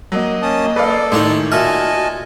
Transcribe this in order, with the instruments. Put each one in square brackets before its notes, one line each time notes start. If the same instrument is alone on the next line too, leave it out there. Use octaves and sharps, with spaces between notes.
[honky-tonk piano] F#3 [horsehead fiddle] A#3 D#5
[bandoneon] C#4 A5 D#6
[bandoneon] A4 D5 [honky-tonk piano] B4 F5
[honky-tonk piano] A2 D#3 [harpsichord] G#3 D4 A#5
[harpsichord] A#2 E5 [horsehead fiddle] F#4 [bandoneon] D#5 G#5 A5 [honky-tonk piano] F6